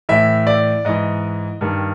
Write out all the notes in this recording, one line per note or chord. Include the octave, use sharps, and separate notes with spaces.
A2 E3 E5
D5
G#2 E3 D#5
G2 D#3